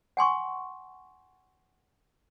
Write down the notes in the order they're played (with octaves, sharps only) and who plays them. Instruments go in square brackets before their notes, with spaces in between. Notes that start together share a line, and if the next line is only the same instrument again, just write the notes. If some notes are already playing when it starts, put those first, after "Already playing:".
[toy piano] F#5 G#5 C6 C#6